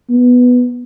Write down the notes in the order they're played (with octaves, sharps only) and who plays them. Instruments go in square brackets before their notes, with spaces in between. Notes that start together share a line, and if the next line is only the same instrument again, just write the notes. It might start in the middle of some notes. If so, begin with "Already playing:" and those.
[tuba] B3